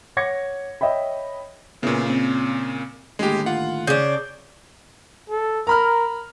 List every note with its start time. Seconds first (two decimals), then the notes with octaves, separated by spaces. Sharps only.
0.17 C#5 F#5 D6 G#6 A#6 C#7
0.81 C#5 D#5 E5 G5 B5
1.83 A#2 C#3 B3 E4
2.10 C4
3.19 D#2 A2 D3 G#3 G4
3.46 F4 F#5
3.87 C#3 D4 G6
5.30 A4
5.67 A#4 A#5 B5 F6